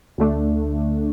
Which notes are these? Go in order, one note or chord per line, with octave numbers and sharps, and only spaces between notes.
D2 D3 A3 D4